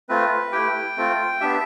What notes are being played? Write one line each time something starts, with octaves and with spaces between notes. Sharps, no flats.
A3 C4 F4 B4
A3 E4 G4 G5
A3 C4 F4
B3 D4 G4 E5